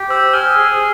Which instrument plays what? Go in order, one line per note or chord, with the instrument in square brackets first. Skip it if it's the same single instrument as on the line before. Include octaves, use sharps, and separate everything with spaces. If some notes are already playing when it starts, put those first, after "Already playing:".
Already playing: [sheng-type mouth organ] G4
[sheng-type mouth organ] C5 [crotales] E6
[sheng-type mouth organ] G#5 [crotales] F6
[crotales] E6
D#6
[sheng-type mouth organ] G#4 [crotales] E6